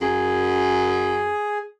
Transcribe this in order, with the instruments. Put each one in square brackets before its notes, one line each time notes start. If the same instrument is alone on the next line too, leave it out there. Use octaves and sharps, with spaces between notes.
[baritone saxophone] F#2 [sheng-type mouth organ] G#4